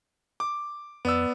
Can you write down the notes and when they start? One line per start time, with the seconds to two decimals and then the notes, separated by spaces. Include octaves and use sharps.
0.40 D6
1.05 F2 B3 D5 E6